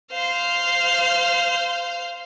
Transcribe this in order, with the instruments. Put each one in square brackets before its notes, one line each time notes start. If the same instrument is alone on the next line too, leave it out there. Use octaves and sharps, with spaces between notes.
[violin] C5 F5